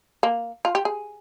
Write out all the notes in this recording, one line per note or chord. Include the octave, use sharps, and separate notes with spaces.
A#3
F4
G4
G#4